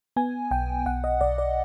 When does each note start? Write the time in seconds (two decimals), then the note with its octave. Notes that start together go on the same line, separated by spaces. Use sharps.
0.16 B3 G#5
0.51 B1 G5
0.86 B1 F#5
1.04 D#5
1.21 B1 D5
1.38 D5